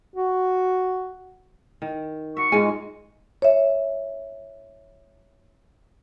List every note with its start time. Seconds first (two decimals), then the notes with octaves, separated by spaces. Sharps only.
0.16 F#4
1.82 D#3
2.37 F#4 E5 C#6
2.52 G#2 G#3 F4 G#4 G#5
3.42 C#5 E5